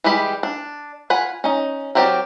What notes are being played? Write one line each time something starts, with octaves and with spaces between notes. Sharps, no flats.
E3 G3 G#3 G4 B5
D4
F4 F#5 G#5 B5
C#4 D#4
F#3 C4 G4 A#4 D5